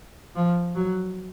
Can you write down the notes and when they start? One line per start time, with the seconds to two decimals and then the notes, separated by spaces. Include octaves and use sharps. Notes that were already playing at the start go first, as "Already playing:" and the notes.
0.35 F3
0.76 F#3